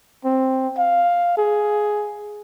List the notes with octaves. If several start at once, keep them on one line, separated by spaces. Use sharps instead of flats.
C4
F5
G#4